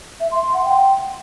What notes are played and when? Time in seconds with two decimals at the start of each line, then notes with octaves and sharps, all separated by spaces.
0.20 E5
0.32 C6
0.43 C6
0.54 F#5
0.65 G5